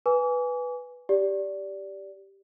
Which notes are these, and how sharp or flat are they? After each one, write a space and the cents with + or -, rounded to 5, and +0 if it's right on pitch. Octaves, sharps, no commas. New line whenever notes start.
B4 +0 G#5 +0 D6 -40
G4 +0 D5 -15